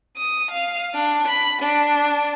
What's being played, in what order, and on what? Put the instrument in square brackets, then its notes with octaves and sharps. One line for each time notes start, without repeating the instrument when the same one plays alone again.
[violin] D#6
F5
D4
B5
D4